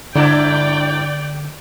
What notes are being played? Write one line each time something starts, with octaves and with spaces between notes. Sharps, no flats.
G2 D3 D4 E4 D5 G5